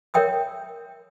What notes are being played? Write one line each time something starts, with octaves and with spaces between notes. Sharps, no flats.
A#4 C#5 E5 G5 D#6 E6